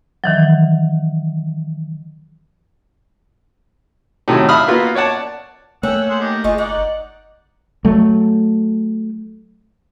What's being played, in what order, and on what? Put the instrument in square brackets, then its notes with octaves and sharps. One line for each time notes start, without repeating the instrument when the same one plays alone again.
[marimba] D#3 E3 F#3
[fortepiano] A2 C3 D#3 F#3 A3
E5 F5 B5 D#6 F6
A#3 B3 F4 F#4
C#5 D5 F#5 A5
[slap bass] A3 A#3 [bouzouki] C#4 [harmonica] F#5 G5 E6
[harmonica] G#4 C5 F#5
D#3 G4 D#5
[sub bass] G1 [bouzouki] G#3 F4 D#5 [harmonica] C#6
[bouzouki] D#4 [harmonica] D5 F#5
[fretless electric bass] F#3 A3